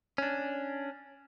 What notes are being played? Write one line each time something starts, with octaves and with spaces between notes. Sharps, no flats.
C#4 D4